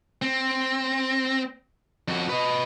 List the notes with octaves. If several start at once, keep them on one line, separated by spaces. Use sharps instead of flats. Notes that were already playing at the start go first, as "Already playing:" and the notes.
C4
F2 F#4
B4 D#5